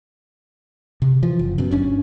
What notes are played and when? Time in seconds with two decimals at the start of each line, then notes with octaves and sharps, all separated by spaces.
1.02 C3
1.23 E3 F3
1.39 F#1
1.58 F#2 B2
1.71 G1 C#4 D4